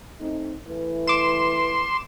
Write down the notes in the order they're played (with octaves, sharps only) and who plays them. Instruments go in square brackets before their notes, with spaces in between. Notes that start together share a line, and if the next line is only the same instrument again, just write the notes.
[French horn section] A3 C4 D#4
E3 A3 B4
[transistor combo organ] C6 [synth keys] D6 E7